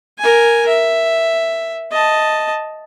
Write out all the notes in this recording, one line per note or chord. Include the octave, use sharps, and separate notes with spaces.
A#4 G#5
E5
D#5 A5